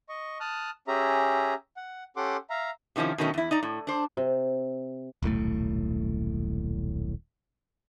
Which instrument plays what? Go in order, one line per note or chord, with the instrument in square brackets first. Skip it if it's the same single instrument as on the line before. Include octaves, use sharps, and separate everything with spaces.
[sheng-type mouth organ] D#5 C#6
A5 D#6 F6 F#6
C#4 G4 G#4 E5 A#5
F#5
C#4 G4 A4 F#5 C6 D6
E5 F5 A#5
[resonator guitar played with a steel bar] C3 D#3 F3 C#4 E4
B2 D#3 F#3 A3 B3 C#4
E2 E4
D#4 D5 A#5
A2
D4 C5
[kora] C3
[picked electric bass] D#1 B1 A2 A3